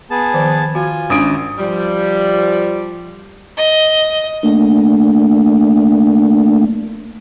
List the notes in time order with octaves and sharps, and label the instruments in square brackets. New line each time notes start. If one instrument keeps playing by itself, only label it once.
[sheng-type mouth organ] B3 G#4 A5
[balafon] D#3 F3 C5
[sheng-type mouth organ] F4 G#5 [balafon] F#4
[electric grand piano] G#1 D#6 D7 [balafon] C#4 D4
[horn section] F3 G3
[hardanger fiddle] D#5
[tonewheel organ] A3 A#3 D4